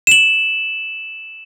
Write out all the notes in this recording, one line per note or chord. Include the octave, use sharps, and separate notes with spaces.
E7 F#7